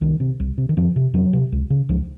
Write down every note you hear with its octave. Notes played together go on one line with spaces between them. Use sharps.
C2 D#3
C3
C2
C3
D#3
F2 F3
C3
F2 F#3
C3
C#2
C#3
C#2 F3